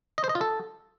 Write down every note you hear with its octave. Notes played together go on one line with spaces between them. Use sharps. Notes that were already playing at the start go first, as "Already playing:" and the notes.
D#5
C5
D#5
F4
A4